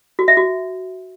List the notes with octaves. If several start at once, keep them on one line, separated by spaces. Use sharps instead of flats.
F#4
E5
F#4